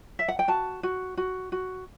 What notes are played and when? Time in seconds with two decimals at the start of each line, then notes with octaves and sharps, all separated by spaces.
0.19 E5
0.28 F#5
0.39 G5
0.48 F#4 A5
0.83 F#4
1.17 F#4
1.52 F#4